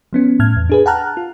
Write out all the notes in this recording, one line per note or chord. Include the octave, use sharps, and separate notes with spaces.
F3 B3 C#4
A2 F6 G#6
E2
D4 G#4 B4
F#5 G5 A5 A#5 F6 F#6
F4